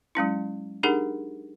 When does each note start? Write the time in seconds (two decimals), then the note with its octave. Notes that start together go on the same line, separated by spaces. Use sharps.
0.15 F#3 G#3 C#4 E4
0.83 D4 D#4 G4 G#4 A#4 F#5